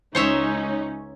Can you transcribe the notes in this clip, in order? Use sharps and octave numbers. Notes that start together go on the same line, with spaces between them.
C#2 C#4 D#4 C5 C#5 E5